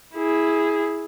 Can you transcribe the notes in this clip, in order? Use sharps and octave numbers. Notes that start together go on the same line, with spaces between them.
E4 G#4